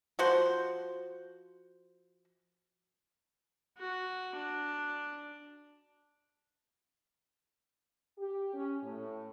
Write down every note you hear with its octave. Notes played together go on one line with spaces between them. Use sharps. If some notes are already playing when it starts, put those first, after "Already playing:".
F3 F#4 C5
F#4
D4
G4
C#4
A2